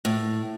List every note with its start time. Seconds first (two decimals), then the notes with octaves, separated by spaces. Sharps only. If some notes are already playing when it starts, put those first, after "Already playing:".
0.05 A2